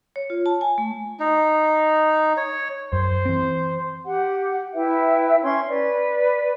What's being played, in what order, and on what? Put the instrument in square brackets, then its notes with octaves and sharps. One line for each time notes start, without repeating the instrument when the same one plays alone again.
[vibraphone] C#5
F4
A5
G#5
A3
[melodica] D#4
C#5
[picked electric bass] F#2 [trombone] C5
[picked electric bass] E3 C4
[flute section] G4 F#5
E4 B4 E5 G5
C#4 C#5 C6 C#6
B4 D5